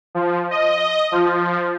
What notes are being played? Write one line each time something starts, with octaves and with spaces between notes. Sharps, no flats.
F3
D#5
F3